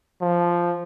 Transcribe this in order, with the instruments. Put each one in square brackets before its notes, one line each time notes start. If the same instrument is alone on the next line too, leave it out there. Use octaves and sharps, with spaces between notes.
[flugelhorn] F3